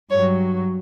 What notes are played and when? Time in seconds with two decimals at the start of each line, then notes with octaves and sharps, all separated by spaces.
0.10 G2 F#3 C#5